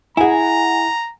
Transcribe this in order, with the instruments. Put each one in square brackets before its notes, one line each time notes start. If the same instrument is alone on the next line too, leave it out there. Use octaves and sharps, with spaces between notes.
[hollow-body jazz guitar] E4 G#4 [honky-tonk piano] F#5 G#5 [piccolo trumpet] A#5